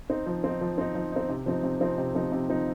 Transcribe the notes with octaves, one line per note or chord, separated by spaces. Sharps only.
C4 D#4
F3
C4 D#4
F3
C4 D#4
F3
C4 D#4
C3
F3 C4 D#4
C3
F3 C4 D#4
C3
F3 C4 D#4
C3
F3 C4 D#4